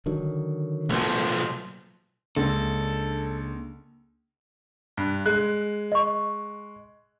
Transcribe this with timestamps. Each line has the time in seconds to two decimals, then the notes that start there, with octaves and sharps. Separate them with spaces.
0.06 D3 D#3 F#3
0.90 B1 F3 A3 A#3
2.37 C#2 A#3 D4 A4
4.97 G2
5.25 G#3 F#6
5.92 D#5 C#6